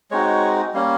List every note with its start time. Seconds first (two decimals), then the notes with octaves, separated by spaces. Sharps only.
0.11 G#3 C4 D#4 F#4 C#5
0.74 G3 A#3 C#4